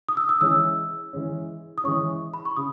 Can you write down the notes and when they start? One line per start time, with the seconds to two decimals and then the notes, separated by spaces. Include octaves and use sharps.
0.09 D#6
0.17 E6
0.29 D#6
0.41 E3 G#3 C#4 E6
1.13 E3 G#3 C#4
1.78 D#6
1.84 E3 G#3 C#4 C#6
2.34 B5
2.45 C#6
2.57 C#3 D#6